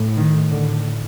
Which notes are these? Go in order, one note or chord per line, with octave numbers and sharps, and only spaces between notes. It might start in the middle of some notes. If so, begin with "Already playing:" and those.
Already playing: A2
D#3
A2 D3